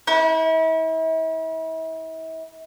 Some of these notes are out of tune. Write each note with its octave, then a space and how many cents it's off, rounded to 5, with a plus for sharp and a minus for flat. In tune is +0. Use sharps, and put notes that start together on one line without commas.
E4 -40